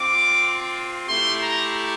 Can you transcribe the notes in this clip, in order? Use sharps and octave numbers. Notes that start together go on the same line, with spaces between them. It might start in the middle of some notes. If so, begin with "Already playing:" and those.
Already playing: C4 F4 D6
A3 E4 G4 C6
A#5